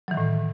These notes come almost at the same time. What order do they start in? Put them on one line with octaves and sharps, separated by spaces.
F#3 E3 D#3 A2